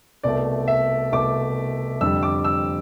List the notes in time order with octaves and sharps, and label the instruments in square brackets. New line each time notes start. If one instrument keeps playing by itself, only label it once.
[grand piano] C2 B2 A3 D5
E5
C2 B2 A3 D6
F2 D3 G3 E6
D6
E6